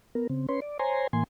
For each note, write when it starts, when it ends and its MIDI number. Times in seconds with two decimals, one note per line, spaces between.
0.15 0.27 59
0.15 0.27 70
0.29 0.46 49
0.29 0.46 60
0.49 0.60 61
0.49 0.60 71
0.49 0.60 73
0.49 0.60 84
0.62 0.78 74
0.79 1.07 72
0.79 1.07 73
0.79 1.07 80
0.79 1.07 82
0.79 1.07 84
1.13 1.24 45
1.13 1.24 52
1.13 1.24 58
1.13 1.24 80
1.13 1.24 84